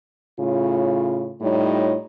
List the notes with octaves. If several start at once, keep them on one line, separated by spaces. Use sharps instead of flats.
A2 C#3 F4
A2 G3 D#4 F4 C#5